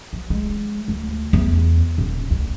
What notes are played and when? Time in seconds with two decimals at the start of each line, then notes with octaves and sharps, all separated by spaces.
0.13 F3
0.30 G#3
0.88 D2
1.33 E2
1.98 D#1
2.31 D2